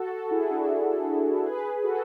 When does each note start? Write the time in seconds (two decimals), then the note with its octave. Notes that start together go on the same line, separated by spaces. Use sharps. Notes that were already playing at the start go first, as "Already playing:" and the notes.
Already playing: F#4 A4
0.12 F#4 A4
0.31 E4 G#4
0.50 D4 F#4
1.46 G#4 B4
1.84 F#4 A4